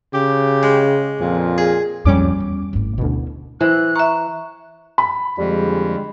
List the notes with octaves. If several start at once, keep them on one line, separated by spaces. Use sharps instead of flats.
C#3 G4
G#3
F2 A#2
G#4
F2 A#2 G3 C#4 D6
E2
G#1 A2
D2 B2 C#4 E4
E3 E4 C5 F#6
E5 A#5 C#6
B5
F2 D3 G3 G#3